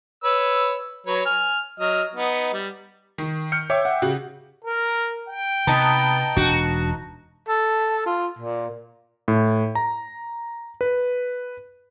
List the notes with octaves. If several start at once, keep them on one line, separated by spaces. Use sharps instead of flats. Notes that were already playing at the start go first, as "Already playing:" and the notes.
B4 C#5 E6
F#3 B4 C#5
G#5 F6
F#3 D#5 F6
B3 D#4
G3
D#3
F6 G6 C#7
C#5 E5 G5 D6
F#5
C#3 F#4 G4
A#4
G5
C3 B3 D#4 A5 A#5
E1 D4 F#4
A4
F4
A#2
A2
A#5
B4